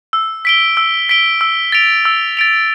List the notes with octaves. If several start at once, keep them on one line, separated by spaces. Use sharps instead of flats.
E6
B6 D7 G7
E6
B6 D7 G7
E6
A6 D7 F7
E6
A6 D7 F7